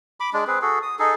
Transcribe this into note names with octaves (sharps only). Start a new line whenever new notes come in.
B5 D6
G#3 D4
C4 G#4 B4
F#4 G#4 A4
D#6
D#4 G#4 A4